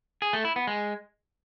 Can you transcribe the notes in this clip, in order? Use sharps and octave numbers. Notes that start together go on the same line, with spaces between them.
G#4
A3
E4
B3
G#3